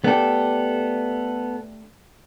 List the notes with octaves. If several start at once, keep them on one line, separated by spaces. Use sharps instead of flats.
A3 B3 D4 G4 A4